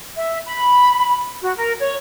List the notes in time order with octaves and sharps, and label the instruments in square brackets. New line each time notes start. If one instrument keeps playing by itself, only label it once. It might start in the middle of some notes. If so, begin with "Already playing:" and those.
[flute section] E5
B5
F#4
A#4
C#5